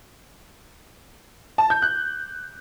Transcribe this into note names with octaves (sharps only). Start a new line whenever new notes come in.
A5
G6
F#6